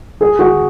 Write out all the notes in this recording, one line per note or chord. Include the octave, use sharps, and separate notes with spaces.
G#4
F#4